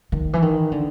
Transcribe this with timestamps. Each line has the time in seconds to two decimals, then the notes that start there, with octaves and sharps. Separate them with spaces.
0.12 D#3
0.33 E3
0.42 D#3
0.72 D3